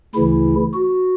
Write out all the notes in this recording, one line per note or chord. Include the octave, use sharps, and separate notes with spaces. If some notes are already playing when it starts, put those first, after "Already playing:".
D2 C#3 E3 E4
F#4